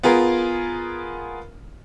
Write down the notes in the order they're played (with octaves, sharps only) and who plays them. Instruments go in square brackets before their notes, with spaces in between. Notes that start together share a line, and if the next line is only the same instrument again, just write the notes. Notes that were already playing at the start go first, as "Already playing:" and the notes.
[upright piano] B3 F4 G#4 A#4